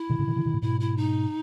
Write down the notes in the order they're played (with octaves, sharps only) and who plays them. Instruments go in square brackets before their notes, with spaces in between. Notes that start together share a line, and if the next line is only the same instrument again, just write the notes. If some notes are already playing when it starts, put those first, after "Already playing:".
Already playing: [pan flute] E4
[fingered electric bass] B2 D#3
A2 C#3
B2 D#3
C#3 E3
B2 D#3
A2 C#3
[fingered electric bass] G#2 B2 [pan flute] E4
[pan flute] E4
D#4